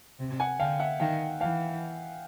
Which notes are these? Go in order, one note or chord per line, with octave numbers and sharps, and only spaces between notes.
C3
F#5 G#5
D3 F5 G5
E5 F#5
D#3 F5 G5
E3 F5 G5